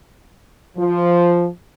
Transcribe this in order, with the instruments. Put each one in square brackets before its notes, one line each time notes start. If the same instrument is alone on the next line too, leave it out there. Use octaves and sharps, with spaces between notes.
[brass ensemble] F3